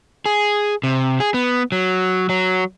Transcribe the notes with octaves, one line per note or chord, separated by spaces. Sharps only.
G#4
C3
G#4
B3
F#3
F#3